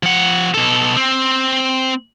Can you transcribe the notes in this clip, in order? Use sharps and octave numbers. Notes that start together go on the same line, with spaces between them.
F3 F#5
B2 A4
C4